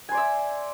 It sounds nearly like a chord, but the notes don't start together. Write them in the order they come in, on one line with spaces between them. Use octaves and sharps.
G#5 C5 D5 E5